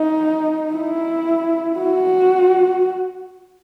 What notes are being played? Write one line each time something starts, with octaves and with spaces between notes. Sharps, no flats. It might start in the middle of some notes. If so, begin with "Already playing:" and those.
Already playing: D#4
E4
F#4